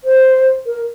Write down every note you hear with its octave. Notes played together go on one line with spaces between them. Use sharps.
C5
A#4